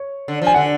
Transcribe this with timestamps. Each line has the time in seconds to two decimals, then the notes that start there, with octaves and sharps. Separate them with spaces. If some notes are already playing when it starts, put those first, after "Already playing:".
Already playing: C#5
0.28 D3
0.42 F3
0.47 G#5
0.54 D3 F#5